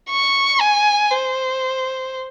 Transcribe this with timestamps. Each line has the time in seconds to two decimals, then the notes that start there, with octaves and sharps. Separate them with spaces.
0.10 C#6
0.60 G#5
1.11 C5